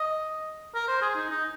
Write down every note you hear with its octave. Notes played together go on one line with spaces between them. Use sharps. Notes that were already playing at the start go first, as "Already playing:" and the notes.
Already playing: D#5
A#4
C5
G#4
D#4
D#4